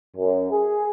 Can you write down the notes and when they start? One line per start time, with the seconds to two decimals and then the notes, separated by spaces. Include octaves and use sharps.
0.16 F#2
0.50 G#4